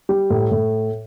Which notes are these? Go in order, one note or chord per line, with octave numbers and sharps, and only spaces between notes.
G3
A2
A2